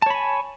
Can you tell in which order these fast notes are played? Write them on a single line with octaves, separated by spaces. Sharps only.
A5 C#5 B5 G#5